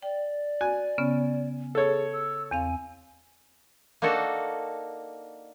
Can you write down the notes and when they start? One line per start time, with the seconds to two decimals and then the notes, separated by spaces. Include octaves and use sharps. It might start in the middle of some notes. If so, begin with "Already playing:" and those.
0.03 D5 G5
0.61 F#4 G#5
0.98 C#3 B3 C#4
1.75 G#4 A4 C#5
2.13 E6
2.51 E2 C4 F5 G#5
4.02 A#3 D4 D#4 F#4 A4